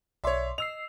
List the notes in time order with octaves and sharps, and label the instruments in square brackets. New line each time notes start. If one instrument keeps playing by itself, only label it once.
[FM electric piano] B1 D5 C6 [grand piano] C#5 E5
[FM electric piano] D#5 E6 C7 [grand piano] F7